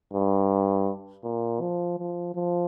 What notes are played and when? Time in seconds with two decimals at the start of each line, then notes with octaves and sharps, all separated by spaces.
0.13 G2
1.24 A#2
1.61 F3
1.98 F3
2.35 F3